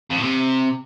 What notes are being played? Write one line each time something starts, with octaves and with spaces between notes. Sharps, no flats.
F2
A2
C3